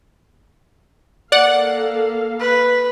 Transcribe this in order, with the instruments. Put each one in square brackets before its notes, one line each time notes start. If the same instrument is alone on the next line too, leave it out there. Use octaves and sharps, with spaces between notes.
[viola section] A#3 A4 F5 [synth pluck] D5 F#5
[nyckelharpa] B4